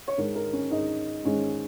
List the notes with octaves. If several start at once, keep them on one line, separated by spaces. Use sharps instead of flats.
C#5
G#2 G#3 A#4
A#4
C#4
G#2 G#3 D#4
G#2 G#3 C#4